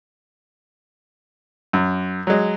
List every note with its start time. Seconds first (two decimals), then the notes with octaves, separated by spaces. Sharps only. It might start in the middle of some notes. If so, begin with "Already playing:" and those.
1.73 F#2
2.27 F#3 G#3